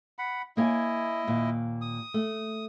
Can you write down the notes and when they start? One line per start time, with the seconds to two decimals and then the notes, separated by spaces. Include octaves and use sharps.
0.19 F#5 B5
0.57 A#3 E4 C#5 D#5 G#5
1.27 D#2 A#2
1.81 D#6
2.14 A3